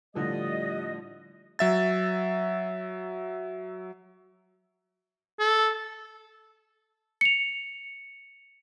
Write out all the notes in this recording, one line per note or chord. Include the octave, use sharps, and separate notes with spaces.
A2 D3 F3 G3 D5 D#5 D#6
F#3 E5 A6
A4
C#7 F7